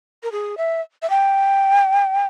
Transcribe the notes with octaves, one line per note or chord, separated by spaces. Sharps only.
A#4
G#4
E5
E5
G5